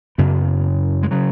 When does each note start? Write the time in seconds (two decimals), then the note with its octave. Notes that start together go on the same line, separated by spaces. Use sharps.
0.18 F#2 C#3 B3
1.03 G#3
1.11 C#3 F#3